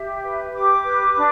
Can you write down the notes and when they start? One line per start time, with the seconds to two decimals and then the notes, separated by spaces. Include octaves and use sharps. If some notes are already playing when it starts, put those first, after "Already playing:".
Already playing: G4 E5
0.23 B4
0.54 G4 D6
0.85 B4
1.15 D4